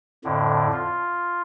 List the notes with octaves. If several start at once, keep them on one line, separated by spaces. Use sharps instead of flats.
F2 A2 D3
F4